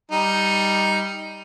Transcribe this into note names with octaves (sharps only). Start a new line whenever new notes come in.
G3 D#4